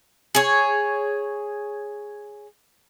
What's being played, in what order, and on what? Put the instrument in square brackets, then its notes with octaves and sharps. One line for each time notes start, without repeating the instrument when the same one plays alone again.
[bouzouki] G#4 C#5